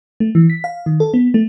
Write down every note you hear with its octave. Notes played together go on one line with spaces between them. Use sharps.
A3
E3
B6
F5
D#3
A4
B3
A3